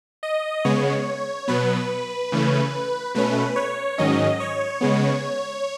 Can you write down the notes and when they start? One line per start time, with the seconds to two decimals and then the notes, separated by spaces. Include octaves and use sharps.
0.23 D#5
0.65 C#3 G#3 B3 C#5
1.48 B2 F#3 B3 B4
2.32 C#3 E3 A3 C#4
3.15 B2 A3 C#4 B4
3.56 C#5
3.98 G#2 D#3 F#3 C#4 D#5
4.40 C#5
4.81 C#3 G#3 B3